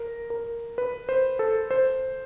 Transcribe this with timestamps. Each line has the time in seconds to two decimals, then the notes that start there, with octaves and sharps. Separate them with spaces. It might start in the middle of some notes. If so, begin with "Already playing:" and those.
Already playing: A#4
0.30 A#4
0.78 B4
1.09 C5
1.39 A4
1.71 C5